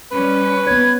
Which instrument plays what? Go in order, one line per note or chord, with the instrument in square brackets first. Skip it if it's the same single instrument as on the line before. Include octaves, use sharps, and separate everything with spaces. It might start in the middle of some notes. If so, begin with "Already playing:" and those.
[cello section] G3 C#4 [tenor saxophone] B4
[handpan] B3 C#5 [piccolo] G#6